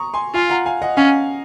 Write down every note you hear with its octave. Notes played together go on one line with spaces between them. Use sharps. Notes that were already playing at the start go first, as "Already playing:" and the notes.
Already playing: A#5 C#6 D#6
G#5 C6
F4 F5 G#5
F#5 A#5
F5 G#5
D#5 F#5
C#4 F5 G#5